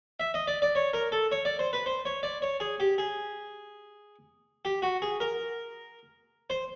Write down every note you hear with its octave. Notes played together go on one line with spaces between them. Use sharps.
E5
D#5
D5
D5
C#5
A#4
A4
C#5
D5
C5
B4
C5
C#5
D5
C#5
G#4
G4
G#4
G4
F#4
G#4
A#4
C5